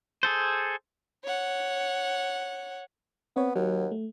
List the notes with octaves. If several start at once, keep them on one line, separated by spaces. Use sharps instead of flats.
G#4 A4 C5
C#5 F#5
B3 C4 C#5
D#2 F#3 F#5
A3